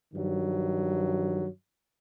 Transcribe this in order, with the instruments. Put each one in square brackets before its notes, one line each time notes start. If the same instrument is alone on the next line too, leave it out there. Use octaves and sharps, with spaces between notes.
[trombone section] G2 D#3 F3 F#3